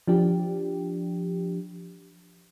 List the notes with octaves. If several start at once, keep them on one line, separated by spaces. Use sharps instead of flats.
F3 D4 G4